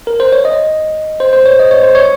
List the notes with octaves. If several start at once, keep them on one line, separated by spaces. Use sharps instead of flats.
A#4
C5
C#5
D#5
C5
C5
C#5
D#5
C#5
C5
C#5